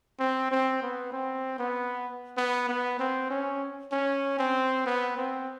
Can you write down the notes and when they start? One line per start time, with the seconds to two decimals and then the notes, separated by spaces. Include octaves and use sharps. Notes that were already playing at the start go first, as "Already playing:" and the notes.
0.19 C4
0.51 C4
0.82 B3
1.12 C4
1.59 B3
2.37 B3
2.69 B3
2.99 C4
3.30 C#4
3.92 C#4
4.39 C4
4.86 B3
5.17 C4